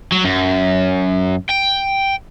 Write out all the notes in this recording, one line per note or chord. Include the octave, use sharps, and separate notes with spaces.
F#3
F#2
G5